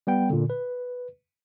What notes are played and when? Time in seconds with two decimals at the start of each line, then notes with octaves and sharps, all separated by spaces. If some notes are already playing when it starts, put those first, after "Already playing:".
0.07 G3 B3 G5
0.30 A#2 D3
0.50 B4